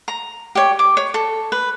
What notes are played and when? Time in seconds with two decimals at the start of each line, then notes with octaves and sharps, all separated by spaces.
0.08 A#5
0.55 G4 C#5
0.79 D6
0.97 C#5
1.14 A4
1.52 B4